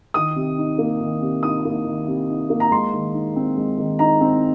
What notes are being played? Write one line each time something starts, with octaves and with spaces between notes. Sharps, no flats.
D#3 D#6
C3
D#4
A#3
D#3
C3
D#4 D#6
A#3
D#3
C3
D#4
A#3
A#5
G#3 C6
D#3
D#4
C4
G#3
D#3
D#4 A#5
C4